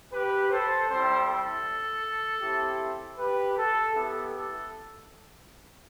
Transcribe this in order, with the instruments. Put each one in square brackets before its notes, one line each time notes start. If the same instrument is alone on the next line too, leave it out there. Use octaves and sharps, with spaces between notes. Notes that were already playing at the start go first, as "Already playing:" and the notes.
[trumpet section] G4 B4
A4 C5
G3 C4 E4 A4 C5
A4
C4 E4 G4
G4 B4
A4
B3 E4 G4 A4
A4